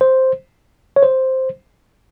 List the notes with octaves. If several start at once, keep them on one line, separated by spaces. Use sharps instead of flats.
C5
C#5
C5